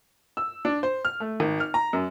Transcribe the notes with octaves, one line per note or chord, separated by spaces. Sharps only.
E6
D4
C5
F6
A3
G#1
F6
A#5
F#2